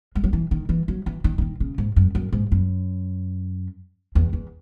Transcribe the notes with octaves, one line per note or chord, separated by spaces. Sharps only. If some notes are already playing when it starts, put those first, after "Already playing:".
G#3
F#3
E3
D#3
E3
F#3
E3
D#3
E3
D#3
C#3
G#2
F#2
F#2
G#2
F#2
E2
E2